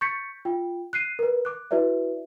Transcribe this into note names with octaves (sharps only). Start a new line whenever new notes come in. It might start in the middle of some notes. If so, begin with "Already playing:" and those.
C#6 G6 A6 B6 C#7
F4 G5
F#6 C7 D#7
A#4 B4
D6 F#6
E4 F#4 B4 D5 E5